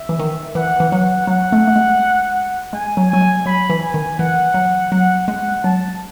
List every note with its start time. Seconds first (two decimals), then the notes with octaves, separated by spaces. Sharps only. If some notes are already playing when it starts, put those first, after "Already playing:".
Already playing: E5
0.09 E3
0.19 D#3
0.55 E3 F#5
0.80 E3
0.92 F#3 F#5
1.27 F#3 F#5
1.52 A3
1.67 A3
1.76 G#3
2.73 G#3 G#5
2.97 F#3
3.10 F#3 G#5
3.21 G#3
3.46 F#3 B5
3.70 E3
3.82 G#5
3.94 D#3
4.19 E3 F#5
4.54 F#3
4.91 F#3 F#5
5.28 G#3 F#5
5.64 F#3 A5